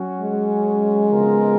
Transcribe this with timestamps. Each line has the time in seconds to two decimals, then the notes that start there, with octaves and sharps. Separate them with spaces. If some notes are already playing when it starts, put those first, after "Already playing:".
Already playing: F#3 C#4 F#4
0.21 G#3
1.11 C#3 F3 B3 F4 A#4